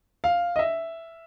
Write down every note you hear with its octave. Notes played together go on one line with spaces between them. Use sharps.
F5
D#5
E5